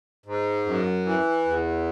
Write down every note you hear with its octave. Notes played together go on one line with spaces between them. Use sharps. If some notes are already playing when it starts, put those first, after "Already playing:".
G#2
F#2
E3
E2